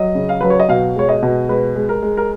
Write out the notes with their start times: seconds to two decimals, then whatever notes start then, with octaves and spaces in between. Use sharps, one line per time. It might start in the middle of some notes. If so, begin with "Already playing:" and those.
Already playing: F#3 D#5
0.15 C#3
0.29 F5
0.41 F#3 B4
0.50 C#5
0.60 D#5
0.69 B2 F5
0.96 G#3 C#5
1.09 D#5
1.23 B2
1.49 G#3 B4
1.76 G#3
1.89 A#4
2.02 G#3
2.17 A#4